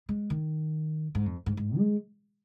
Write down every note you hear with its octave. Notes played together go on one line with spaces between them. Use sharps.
G#3
D#3
G#2
F2
G#2
G#2
G#3